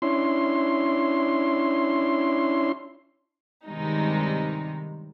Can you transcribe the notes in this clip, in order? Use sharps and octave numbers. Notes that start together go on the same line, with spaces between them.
C#4 D4 E4 C6
G2 C3 D#3 G3 G#3 D#4